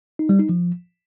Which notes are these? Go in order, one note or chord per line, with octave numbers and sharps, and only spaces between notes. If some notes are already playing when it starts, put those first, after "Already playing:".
D#4
G3
D#4
F3